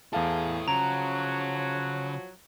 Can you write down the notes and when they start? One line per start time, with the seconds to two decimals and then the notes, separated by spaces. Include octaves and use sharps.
0.13 E2 E4 G#4 A4 F5 A5
0.68 C#3 F3 F#3 A#5 D7